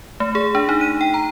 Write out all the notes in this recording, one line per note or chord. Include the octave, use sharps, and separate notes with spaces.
A3
G#4
D4
D#4
D#7
G5
A#5